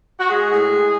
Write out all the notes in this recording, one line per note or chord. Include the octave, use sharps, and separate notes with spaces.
F#4
G#3 G#4
A2
G#3